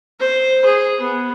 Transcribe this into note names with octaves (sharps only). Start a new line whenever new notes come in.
C5
G#4
B3